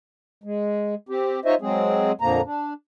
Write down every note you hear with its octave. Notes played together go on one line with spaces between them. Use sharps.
G#3
C4 G4
D#4 F4 C5 C#5 D#5 E5
F#3 G#3 C4 G#4
F2 A#2 D3 F3 A#3 A#5
D4